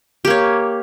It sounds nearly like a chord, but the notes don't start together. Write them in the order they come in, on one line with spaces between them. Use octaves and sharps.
G4 A#3 C#5